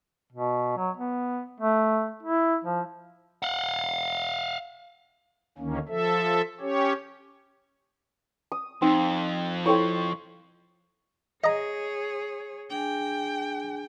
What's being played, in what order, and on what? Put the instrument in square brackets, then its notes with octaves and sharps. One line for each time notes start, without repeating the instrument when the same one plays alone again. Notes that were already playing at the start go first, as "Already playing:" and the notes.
[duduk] B2
F#3
B3
A3
E4
F3
[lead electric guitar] F5 F#5
[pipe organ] D2 D#3 A#3 C#4
F3 A4 E5
C#4 G4 C#5
[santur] D#6
[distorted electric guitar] F2 [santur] C4 [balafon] D#4
[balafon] E4 A4 G5 [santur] C5 C#5
[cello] G#4 C#5 [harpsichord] D#5 A#5
[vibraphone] D4 G#4 G#5 [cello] G5